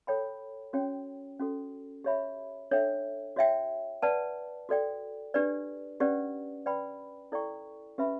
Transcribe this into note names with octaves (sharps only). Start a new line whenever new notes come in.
A4 C#5 G5 B5
C#4 F#4 C#5 G5
C#4 F#4 A4
G4 C#5 E5 B5
D4 A4 C#5 E5 G5
F#4 C#5 E5 G5
B4 D5 F#5 A5
F#4 A4 D5 G5
D4 G4 B4 D5
C#4 G4 B4 D5 F#5
B4 D5 G5 B5
E4 A4 D5 G5 C#6
C#4 G4 B4 E5 B5